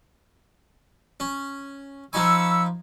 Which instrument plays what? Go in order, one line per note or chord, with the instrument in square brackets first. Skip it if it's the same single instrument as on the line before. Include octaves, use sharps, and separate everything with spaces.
[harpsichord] C#4
[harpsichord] F3 D#4 G#5 [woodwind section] B5 C#6 E6